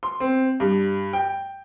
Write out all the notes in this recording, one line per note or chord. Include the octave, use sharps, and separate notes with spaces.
C6
C4
G2
G5